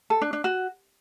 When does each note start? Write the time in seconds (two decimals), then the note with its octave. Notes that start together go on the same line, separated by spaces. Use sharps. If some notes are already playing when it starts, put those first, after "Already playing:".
0.10 A4
0.22 D4
0.33 D4
0.44 F#4